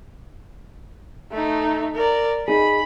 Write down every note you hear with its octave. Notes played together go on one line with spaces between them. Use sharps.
A3 D#4
A#4 D5
D#4 G#4 B5